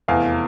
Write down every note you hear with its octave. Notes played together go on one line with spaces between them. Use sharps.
F1 E2 E3 F5 G#5